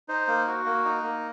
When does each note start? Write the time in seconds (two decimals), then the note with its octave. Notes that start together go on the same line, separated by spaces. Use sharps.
0.08 D#4 C5
0.28 A#3
0.47 F#4
0.66 A#3
0.85 D#4
1.03 A#3